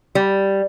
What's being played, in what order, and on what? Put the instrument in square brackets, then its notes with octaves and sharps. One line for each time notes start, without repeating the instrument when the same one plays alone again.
[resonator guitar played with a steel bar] G3